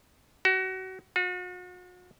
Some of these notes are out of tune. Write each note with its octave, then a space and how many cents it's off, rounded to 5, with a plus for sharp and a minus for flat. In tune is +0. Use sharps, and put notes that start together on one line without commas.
F#4 +30
F#4 -40